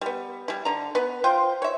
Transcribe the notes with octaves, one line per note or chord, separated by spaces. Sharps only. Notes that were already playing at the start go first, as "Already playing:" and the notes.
G3 B3
G3 E4
D3 A#5
B3 B4
F4 C5 G5
C#5 E5